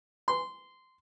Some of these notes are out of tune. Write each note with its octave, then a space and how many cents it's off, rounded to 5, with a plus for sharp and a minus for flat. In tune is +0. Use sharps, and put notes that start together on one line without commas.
C6 -15